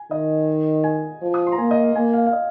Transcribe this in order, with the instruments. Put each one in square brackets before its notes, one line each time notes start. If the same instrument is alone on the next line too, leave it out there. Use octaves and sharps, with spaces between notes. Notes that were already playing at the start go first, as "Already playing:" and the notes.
Already playing: [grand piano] G#5
[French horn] D#3 [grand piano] D#5
[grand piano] G#5
[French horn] F3
[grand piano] D#6
C6
A#5
[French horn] A#3 [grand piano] G#5
[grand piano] D#5
F5
[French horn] A#3 [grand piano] G#5
[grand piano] F5
F5
D#5